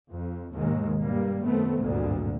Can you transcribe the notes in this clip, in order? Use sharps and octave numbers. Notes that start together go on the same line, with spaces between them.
F2
D#2 G#2 B2 D#3 G#3
G2 G3 A#3
F#2 D#3 A3 B3 C4
G#1 D2 G2 A#2 D3